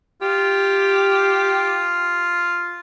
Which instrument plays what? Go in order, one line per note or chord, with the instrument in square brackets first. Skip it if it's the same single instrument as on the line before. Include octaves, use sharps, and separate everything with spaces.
[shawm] F4 [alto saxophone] G4